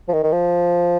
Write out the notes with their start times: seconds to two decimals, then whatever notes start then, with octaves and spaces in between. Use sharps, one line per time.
0.08 F3
0.13 D#3
0.23 D#3
0.32 F3